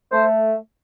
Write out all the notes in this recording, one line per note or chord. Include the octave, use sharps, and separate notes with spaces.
A3 C5